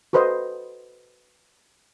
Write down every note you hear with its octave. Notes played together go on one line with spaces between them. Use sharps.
F#4 A4 B4 C5 D#5